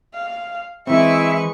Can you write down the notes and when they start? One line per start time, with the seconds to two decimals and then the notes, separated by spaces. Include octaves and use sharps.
0.14 F5
0.87 E3 G#3 C4 E4 B4 E5 C#6